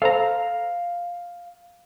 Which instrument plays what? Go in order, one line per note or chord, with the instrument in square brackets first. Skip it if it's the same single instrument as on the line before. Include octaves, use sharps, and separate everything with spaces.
[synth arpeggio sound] A4 C5 A#5 [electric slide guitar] F5